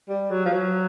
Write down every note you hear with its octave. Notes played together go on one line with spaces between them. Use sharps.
G3
F#3
F3
F#3